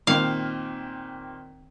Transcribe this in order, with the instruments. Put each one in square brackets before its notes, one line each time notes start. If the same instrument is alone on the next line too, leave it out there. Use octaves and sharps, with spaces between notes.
[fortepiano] A#2 D#3 C4 [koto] F5